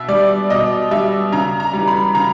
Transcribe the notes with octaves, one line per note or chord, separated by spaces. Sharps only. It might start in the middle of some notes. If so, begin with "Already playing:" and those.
Already playing: B2 E5
G3 D5
B2 D#5
G3 E5
C#3 A#5
A#5
G3
E3
B5
C#3 A#5